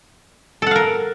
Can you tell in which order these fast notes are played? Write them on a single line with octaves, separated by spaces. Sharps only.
A4 F#5 F5 A#4